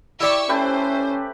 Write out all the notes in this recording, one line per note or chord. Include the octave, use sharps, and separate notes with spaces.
E4 G4 D5 B5 C#6 E6
A3 C#4 G4 B4 C5